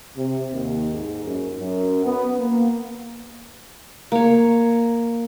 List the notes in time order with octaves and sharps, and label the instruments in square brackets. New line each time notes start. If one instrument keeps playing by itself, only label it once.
[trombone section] C3
D#2
G#2
F#2
F#2
B3
A#3
[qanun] A#3 C#5